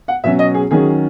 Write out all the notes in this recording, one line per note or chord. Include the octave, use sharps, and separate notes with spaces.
F#5
B2 F#3 C#4 E5
D#5
G#4
D#3 F#3 C#4 G#4